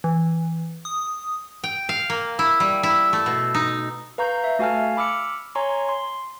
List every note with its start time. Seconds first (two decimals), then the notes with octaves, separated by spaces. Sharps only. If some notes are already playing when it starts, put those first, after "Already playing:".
0.04 E3
0.85 D#6
1.64 G5
1.89 F5
2.10 A#3
2.39 E4
2.60 G3
2.83 E4
3.13 A3
3.26 B2
3.54 D#4
4.18 B4 F5 A#5 C#6 G6
4.44 E5
4.59 A3 F#4 F5 G#5 A5 F6
4.97 B5 D6 E6 F6 C#7
5.55 C#5 G#5 A#5 C6 C#6
5.89 C6